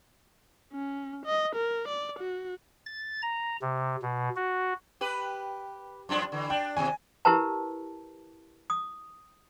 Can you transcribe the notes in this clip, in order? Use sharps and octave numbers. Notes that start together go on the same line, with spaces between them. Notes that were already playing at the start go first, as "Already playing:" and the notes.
C#4
D#5
A#4
D5
F#4
A6
A#5
C3
B2
F#4
G4 B4
F#2 F3 D4
D3 E3
D4 G5
D#2 C3 G#5
E4 G4 A#4 B4 A5
D#6